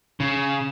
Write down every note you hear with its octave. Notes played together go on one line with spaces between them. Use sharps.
C#3